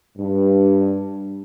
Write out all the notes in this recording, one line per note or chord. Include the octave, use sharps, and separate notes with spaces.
G2